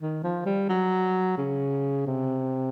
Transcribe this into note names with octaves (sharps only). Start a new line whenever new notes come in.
D#3
F3
G3
F#3
C#3
C3